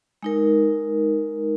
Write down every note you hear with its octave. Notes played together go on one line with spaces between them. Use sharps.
G#3 D#4 A#4